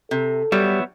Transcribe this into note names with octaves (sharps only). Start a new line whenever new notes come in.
C3 A4
F#3 G3 B3 C#5 E5